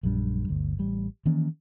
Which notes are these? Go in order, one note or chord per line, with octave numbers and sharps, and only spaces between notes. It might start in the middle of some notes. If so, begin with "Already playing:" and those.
A#1 F#2 G3 D4
G1 D2
A1 G3
D#3 E3 A#3 C#4